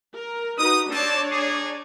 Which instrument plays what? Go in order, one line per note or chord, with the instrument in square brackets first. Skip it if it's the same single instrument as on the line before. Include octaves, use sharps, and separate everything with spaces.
[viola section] A#4
[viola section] D#4 F#4 B4 [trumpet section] D#6
[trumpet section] C4 A4 A5 [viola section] D4 C#5 D5
[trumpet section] D#4 G#4